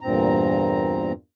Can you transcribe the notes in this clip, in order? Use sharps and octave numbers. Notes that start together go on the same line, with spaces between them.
E2 G2 A#2 C4 A#5